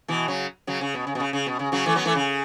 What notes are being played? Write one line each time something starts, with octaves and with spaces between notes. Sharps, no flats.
B2 E3
C#3 F#3
C#3 F#3
C#3
B2
C#3
B2
C#3
C#3
B2
C#3
C#3 F#3
E3 A3
F#3 B3
E3 A3
C#3